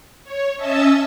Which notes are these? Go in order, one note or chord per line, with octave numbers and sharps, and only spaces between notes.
C#5
C#4 D#5 E5 A5 E6